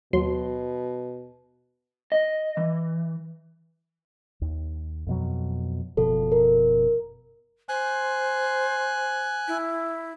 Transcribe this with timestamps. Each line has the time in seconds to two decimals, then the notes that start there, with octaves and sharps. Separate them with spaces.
0.13 D#2 B2 F#3 C6
2.12 D#5
2.57 E3
4.42 D#2
5.07 F2 B2 F#3
5.97 F#1 B2 F3 A4
6.32 A#4
7.69 C5 G#5 F#6
9.48 E4